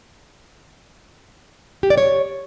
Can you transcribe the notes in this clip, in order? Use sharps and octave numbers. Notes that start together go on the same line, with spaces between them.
G4
D5
C#5